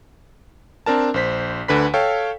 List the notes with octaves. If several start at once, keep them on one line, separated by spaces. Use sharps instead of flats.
C4 D4 A#4 A5
A#1 C5 B6
D2 D3 B4 B5 B6
A4 C#5 F5 G5